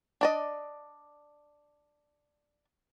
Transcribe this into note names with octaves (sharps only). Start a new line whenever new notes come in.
D4 D5 D#5